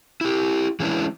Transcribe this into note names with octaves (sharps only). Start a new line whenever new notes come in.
E4 G4
E3 G#3 A3 C#4 D4 E4